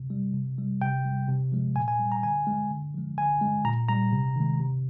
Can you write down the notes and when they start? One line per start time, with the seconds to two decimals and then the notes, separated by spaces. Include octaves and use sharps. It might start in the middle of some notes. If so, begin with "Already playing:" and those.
Already playing: C3
0.10 G3
0.34 C3
0.58 G3
0.82 C3 G5
1.05 G3
1.29 C3
1.52 F3 G#3
1.76 A#2 G#5
1.88 G#5
2.00 G3
2.12 A#5
2.23 D3 G#5
2.47 G#3
2.70 D3
2.94 F3 G#3
3.18 D3 G#5
3.41 G#3
3.65 A#2 A#5
3.89 G3 A#5
4.12 C3
4.36 D#3 G#3
4.60 C3